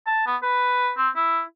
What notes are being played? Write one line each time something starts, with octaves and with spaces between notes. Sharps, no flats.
A5
B3
B4
C4
E4